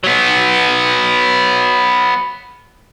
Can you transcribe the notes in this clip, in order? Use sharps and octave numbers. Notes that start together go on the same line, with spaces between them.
F#3 B3